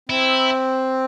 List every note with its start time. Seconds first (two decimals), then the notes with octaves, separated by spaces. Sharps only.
0.09 C4 E4